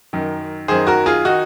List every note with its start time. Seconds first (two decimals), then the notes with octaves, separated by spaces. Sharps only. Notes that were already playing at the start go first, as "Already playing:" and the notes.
0.13 F#2 D#3
0.68 F#2 D#3 G#4 C5
0.87 F#4 A#4
1.06 F4 G#4
1.24 D#3 D#4 F#4